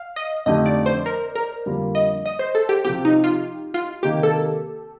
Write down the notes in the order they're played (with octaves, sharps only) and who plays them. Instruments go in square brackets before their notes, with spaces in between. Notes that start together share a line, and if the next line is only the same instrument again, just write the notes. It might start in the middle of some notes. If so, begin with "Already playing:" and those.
Already playing: [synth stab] F5
D#5
[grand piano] F2 D3 A3 D#4 G4 [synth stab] D#5
[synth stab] D5
C5
A#4
A#4
[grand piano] F2 D3 G3 A#3 F4
[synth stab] D#5
D#5
C5
A4
G4
[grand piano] C3 F3 C4 [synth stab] G4
[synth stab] D#4
F4
F4
[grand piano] C3 D#3 A#3 [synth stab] G4
[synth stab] A4